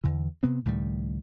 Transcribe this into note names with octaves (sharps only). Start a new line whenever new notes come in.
E2 D3 E3
C3 B3 C4
C#2 A2 D#3 G3